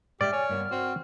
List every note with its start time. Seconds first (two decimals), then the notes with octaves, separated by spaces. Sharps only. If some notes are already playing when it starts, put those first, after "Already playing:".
0.21 A#2 G#3 G4 D5 E5 F6
0.33 C#5 G#5
0.50 G2 A#3 B3
0.71 C4 F#4